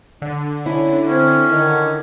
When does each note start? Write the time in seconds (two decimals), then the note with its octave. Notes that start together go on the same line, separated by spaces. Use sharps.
0.22 D3 D4
0.66 C#4 E4
1.09 C4 C#4
1.50 D#3